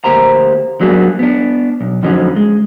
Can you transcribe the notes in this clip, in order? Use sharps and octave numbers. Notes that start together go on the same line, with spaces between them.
D2 A#3 G4 C5 A#5
F#3 G3 A#3 B3 D4 G#4
B3 D4
B1
F2 D3 F3 F#3 C#4 D#4
G#3